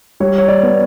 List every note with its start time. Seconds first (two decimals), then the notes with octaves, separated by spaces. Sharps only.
0.20 G3 C#5
0.38 C#5
0.48 D5
0.63 B3